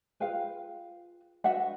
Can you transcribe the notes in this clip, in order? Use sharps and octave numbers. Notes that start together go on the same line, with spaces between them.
F4 G#4 B4 F5 G5
D4 F#4 B4 E5 F#5